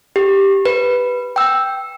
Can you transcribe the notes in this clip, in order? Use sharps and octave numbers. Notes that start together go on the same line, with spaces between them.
G4
B4
G5 E6